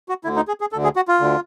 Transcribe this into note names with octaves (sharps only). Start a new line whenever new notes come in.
F#4
D2 D3 E4
D#4
G#4
G#4
D2 D3 A4
G#4
F#4
F4
D2 D3